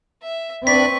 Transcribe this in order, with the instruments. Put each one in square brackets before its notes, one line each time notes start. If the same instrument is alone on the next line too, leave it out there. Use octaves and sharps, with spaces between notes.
[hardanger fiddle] E5
[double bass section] C4 [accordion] D4 D5 B5 [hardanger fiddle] B4 C#6 [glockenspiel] B6